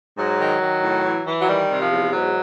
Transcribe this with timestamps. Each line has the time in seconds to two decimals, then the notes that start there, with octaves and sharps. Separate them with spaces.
0.17 G#2 F#3
0.39 D#3
0.61 D#3
0.82 A2
1.04 E3
1.26 E3
1.41 F#3
1.47 D#3 G3
1.69 C3
1.79 F3
1.90 E2
2.11 G#2 F#3